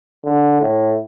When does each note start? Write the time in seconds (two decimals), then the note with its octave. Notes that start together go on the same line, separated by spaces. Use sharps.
0.25 D3
0.61 A2